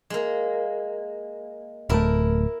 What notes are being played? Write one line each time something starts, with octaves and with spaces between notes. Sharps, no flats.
G#3 A#3
D1 A3 E4 A#4